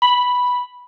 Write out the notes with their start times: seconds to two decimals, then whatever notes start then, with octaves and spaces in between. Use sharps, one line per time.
0.02 B5